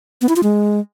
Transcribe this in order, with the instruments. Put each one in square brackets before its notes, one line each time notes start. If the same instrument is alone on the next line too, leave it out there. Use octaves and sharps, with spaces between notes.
[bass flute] B3
E4
F4
G#3